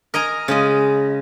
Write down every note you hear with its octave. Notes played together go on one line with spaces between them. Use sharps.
A#4 D#5 G#5 A#5
C#3 G#3 D#5